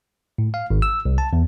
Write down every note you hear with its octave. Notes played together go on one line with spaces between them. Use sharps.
A2
F5
G#1
E6
C2
A5
E2